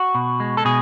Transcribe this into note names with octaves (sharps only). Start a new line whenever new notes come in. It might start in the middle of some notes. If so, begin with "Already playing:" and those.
Already playing: F#4
B2
G#3
A4
B2 G#4